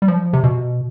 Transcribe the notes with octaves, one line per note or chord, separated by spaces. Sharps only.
G3
F3
C3
B2